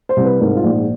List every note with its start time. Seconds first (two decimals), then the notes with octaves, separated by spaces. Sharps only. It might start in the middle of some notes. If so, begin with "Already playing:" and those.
0.09 C5
0.16 C2
0.25 B4
0.40 G#2 A#4
0.56 F4
0.64 A#1